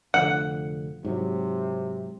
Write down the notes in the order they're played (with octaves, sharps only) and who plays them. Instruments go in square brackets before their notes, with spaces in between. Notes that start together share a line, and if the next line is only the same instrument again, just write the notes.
[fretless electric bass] F1 D3 F3 [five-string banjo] F#5
[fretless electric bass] G#2 F#3 [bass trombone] C3